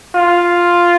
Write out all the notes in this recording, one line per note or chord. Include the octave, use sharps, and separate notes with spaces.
F4